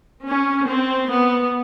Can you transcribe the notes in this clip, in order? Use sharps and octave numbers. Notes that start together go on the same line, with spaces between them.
C#4
C4
B3